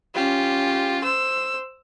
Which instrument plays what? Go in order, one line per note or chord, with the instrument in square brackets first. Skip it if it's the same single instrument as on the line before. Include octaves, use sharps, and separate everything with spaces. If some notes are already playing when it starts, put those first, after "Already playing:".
[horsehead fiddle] C#4 G4 [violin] F4
[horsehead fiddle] C5 [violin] E6